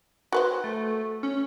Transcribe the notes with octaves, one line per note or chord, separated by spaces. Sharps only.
F#4 B4 C5
A3
C#4